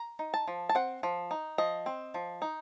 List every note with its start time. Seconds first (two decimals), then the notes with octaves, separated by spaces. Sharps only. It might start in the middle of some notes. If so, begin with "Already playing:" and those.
Already playing: A#5
0.19 D#4
0.34 A5
0.48 F3
0.69 A5
0.75 C4 F#5
1.03 F3
1.31 D#4
1.58 F3 D#5
1.86 C4
2.14 F3
2.42 D#4